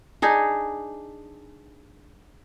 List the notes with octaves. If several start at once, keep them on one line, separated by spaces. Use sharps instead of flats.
D4 D#4 G#4